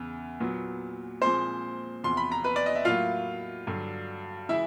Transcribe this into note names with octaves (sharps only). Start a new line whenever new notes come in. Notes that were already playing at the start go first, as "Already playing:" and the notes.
Already playing: E2 C#3
A#2 F#3 B3
A#2 F3 G#3 C4 C5 C6
E2 C3 F3 C6
B5
A#5
B4 B5
D5
D#5
E5
A2 F#3 A#3 F4 F5
G2 D3 F#3
C#3 E3 G#3 E4 E5